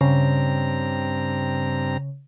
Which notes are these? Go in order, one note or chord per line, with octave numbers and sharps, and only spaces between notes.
G2 C#3 C4 A#5